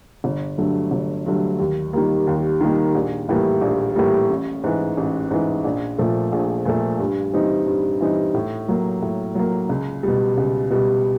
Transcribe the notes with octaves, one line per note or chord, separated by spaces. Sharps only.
G1
G2 D3 F#3 A3
G1
G2 D3 F#3 A3
D#2
D#3 G3 A#3
D#2
D#3 G3 A#3
A#1
A2 E3 G3 A#3
A#1
A2 E3 G3 A#3
A1
G#2 E3
A1
G#2 E3
A#1
A#2 F3 A3
A#1
A#2 F3 A3
G2
E3 G3 C4 D#4
G2
E3 G3 C4 D#4
A2
F#3 A#3
A2
F#3 A#3
C#2
B2 G3
C#2
B2 G3